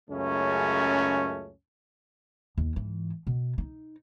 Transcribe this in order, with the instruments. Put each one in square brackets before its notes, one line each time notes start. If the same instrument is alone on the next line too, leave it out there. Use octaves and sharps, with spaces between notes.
[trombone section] C#2 F#2 C#3 A3 C#4
[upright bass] D#2
G#2 E3
B2
D#4